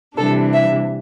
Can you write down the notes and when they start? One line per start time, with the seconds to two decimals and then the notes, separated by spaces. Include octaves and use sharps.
0.16 C3 E3 G3 D4 A4
0.53 E5